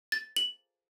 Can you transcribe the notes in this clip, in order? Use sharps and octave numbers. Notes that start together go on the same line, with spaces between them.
A6
F#7